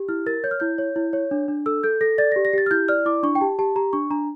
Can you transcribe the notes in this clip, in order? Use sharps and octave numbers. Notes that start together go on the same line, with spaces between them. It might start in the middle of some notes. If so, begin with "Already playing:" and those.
Already playing: G4
E4 F6
A#4 A6
C#5 G6
F6
E4 G6
C#5
E4
C#5
D4
D4
A4 E6
A4 G6
A4 A#6
D5 A6
A#6
G4
A#6
G4 A6
F6
E4 G6
D5 F6
E4 D6
D4 C#6
G5
G4 A5
G4 A5
G4 A#5
D4 C#6
D4 A#5